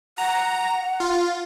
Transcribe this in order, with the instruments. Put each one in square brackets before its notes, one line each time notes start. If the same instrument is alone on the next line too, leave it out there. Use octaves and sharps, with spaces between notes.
[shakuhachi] F#5 [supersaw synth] A#5
[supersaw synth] F4